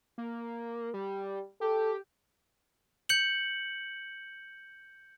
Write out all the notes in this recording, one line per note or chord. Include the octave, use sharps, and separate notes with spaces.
A#3
G3
G4 A4
G6 C#7 F#7